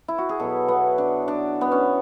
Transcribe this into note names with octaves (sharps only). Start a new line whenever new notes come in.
E4
F#4
G#4
B2 F#3 B3 A4
B3
D4
D4
B3
C#4